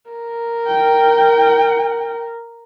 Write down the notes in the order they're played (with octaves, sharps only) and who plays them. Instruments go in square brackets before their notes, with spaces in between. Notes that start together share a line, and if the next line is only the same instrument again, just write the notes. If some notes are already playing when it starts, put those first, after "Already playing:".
[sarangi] A#4
[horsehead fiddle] G5